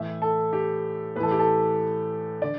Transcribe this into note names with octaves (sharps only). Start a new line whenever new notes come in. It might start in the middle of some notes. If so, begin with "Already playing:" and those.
Already playing: A2 E3 E5
A4
G4
A2 E3 A4 B4
G4
A4
D3 D5